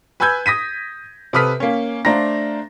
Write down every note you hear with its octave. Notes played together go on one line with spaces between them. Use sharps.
B4 G#5 B5 E6 G6 G#6
D#6 A#6 B6 D#7
C3 A4 B4 D#6 F6 B6
A#3 C#4
A3 D4 C5 F5 A#5 A#6